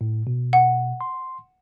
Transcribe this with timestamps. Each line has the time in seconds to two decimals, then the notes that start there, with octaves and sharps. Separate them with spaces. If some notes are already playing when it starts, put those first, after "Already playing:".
0.01 A2
0.27 B2
0.53 F#5
1.01 C6